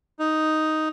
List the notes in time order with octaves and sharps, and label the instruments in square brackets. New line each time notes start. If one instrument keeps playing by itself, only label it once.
[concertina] D#4